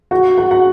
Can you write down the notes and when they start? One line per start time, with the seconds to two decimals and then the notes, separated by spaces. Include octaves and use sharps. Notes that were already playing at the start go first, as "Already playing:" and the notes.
0.11 F#4 F#5
0.38 F#4 F#5
0.51 F#4 F#5